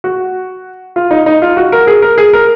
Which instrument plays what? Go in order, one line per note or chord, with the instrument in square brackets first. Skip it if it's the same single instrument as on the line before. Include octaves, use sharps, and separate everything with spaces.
[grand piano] F#4
F4
D#4
D#4
F4
F#4
A#4
G#4
A#4
G#4
A#4